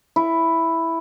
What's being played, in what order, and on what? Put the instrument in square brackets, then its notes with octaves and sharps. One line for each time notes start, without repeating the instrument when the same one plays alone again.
[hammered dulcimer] E4